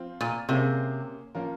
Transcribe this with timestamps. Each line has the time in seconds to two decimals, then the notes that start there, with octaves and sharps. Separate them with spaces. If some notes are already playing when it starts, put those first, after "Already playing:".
Already playing: F3 C4 F4
0.21 A#2
0.49 C3 A#3 C#4 G#4 C5 F5
1.35 F3 A#3 C#4 F4 A#4